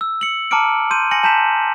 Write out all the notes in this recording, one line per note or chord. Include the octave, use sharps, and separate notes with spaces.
E6
C#7 F#7
A5 A#5 D6 F6 C#7 D7
C6 G6 D#7
G#5 A#6 C#7 F#7
A5 A#5 G6 B6 E7